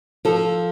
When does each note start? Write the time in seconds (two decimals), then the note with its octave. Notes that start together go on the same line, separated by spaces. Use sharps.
0.25 F3 A4